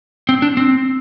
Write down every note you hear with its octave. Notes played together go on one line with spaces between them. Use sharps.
C4
D4
C4